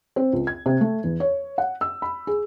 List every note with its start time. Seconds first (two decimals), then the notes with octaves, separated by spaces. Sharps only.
0.16 C4
0.33 C#2
0.47 G#6
0.66 C3
0.81 A3
1.04 E2
1.20 C#5
1.58 F#5
1.81 E6
2.02 B5
2.27 G#4